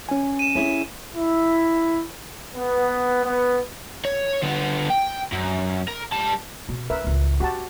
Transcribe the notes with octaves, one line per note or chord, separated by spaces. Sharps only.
C#4 G#5
D#7 E7
C#4 E4 G#4
E4
B3
B3
C#5
D3 B3
G5
F#2
A#4
G3 A5
B2
C#4 A#4 B4 E5
C#2 A2
D4 F#4 G4 A5